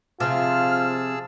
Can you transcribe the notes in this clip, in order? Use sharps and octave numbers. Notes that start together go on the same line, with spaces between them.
C3 F3 F4 G#4 A5 E6 F6